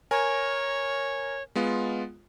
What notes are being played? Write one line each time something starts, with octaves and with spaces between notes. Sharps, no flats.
A#4 C#5 G#5
G#3 B3 F4